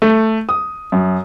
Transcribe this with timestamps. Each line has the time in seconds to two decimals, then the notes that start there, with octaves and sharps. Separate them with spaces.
0.02 A3
0.49 D#6
0.92 F#2